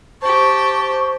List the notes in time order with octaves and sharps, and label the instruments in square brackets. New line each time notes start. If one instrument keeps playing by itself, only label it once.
[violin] G4 A5 [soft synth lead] C5 [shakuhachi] C#6